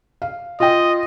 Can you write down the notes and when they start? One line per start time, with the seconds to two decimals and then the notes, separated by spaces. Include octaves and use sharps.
0.22 F5
0.60 F4 D#5 G5